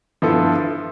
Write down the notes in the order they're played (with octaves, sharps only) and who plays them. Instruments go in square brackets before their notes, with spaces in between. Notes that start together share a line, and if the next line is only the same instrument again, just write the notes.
[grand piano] G2 F3 B3 E4 A4